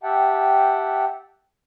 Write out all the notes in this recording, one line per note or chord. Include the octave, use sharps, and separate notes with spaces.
G4 E5 F#5 G5 A5